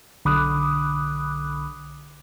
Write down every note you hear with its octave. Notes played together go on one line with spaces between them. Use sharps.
B1 D3 B5 D6 D#6 F#6